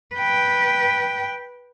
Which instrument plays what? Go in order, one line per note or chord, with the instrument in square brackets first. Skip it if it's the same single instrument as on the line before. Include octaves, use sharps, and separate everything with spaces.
[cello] B4 G5